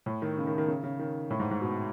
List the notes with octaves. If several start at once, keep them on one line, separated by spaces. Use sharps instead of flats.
A2
D#3
C#3
D#3
D#3
C#3
C#3
D#3
A2
G#2
G#2
B2